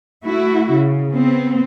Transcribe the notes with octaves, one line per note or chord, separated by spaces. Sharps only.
A3 E4 F#4
C#3
B3 C4